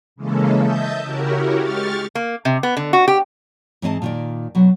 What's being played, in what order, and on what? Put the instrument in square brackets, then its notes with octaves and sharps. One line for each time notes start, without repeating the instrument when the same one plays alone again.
[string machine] C#3 E3 G#3 A#3 C#4 A4
D#5 E5 A5 G6
C#3 C#4 E4 F#4 G4 A#4
G#3 G4 C#6 F6 A6
[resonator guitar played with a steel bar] A#3
C3
B3
D3
F#4
G4
[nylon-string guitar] G#2 E3 C4 D#5 A5
A#2 D#3 D5
B2 F#3